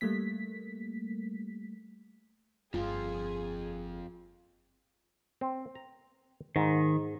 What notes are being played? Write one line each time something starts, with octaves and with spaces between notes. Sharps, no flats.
G3 A3 A#3 B6
G1 F2 F3 A#3 F4 G#4
C4
A#5
G#2 D#3